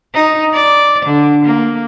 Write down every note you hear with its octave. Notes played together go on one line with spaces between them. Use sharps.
D#4
D5
D3
A#3